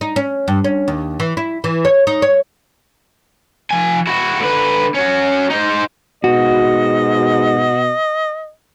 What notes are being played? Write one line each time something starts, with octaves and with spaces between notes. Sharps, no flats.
D#4
C#4
G2
C#4
D#2
E3
E4
E3
C#5
D#4
C#5
F3 G#5
E4 F#4
D3 B4
C#4 F#4
D#4 C5
G#2 B2 F#4 D#5